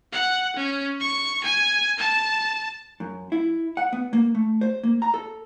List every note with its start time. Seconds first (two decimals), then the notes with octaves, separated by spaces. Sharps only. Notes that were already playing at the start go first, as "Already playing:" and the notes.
0.13 F#5
0.56 C#4
1.00 C#6
1.44 G#5
1.99 A5
3.00 F#2
3.32 E4
3.77 F#5
3.93 B3
4.13 A#3
4.35 A3
4.61 C5
4.83 A#3
5.02 A#5
5.14 A4